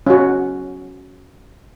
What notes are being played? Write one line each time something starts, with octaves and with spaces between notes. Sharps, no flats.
C#4 F#4